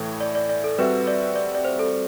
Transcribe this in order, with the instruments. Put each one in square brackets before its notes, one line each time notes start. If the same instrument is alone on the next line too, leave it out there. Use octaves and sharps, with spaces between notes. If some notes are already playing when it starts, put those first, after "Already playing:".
Already playing: [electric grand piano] A2 E3 A3
[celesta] D5
D5
D5
A4
[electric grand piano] G3 C4 F#4 A4 E5 [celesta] B4
[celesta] D5
D5
D5
C5
A4